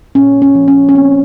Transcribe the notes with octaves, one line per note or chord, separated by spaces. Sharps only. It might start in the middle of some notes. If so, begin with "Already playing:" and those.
A#2 C#4
C#4
F3
C#4
C#4
A#3 C4